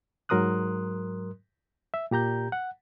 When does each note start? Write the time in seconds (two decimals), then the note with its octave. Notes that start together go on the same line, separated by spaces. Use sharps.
0.29 G#2 F#3 A#4 C6 D#6 F#6
1.94 E5
2.11 A#2 G4 A#5 G6
2.52 F#5